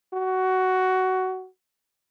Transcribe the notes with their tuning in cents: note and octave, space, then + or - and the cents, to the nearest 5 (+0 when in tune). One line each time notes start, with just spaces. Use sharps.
F#4 +15